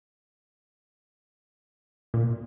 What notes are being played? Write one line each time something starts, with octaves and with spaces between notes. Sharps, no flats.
A#2